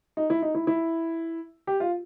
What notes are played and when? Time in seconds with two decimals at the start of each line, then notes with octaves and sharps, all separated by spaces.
0.17 D#4
0.30 E4
0.42 D#4
0.55 E4
0.67 E4
1.67 G4
1.80 F4